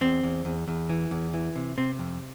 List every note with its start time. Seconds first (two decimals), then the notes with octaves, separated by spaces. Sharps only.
0.01 E2 C4
0.23 E2
0.45 E2
0.68 E2
0.89 E3
1.11 E2
1.34 E3
1.56 C3
1.78 C3 C4
1.99 F2